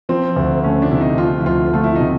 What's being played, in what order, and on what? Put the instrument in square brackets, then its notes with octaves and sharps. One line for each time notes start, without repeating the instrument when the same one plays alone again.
[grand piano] F3 [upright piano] C4
[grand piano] D2
[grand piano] A3 [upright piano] C#4
[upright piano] D4
[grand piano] C3 [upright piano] E4
[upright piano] D#4
[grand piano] F3 [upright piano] F4
[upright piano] E4
[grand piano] D2 [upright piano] F4
[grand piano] A3 [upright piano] F4
[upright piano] E4
[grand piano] C3 [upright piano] D#4